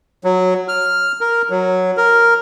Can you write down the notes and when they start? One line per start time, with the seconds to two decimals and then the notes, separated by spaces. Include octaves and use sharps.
0.24 F#3
0.68 F6
1.21 A#4
1.50 F#3
1.97 A#4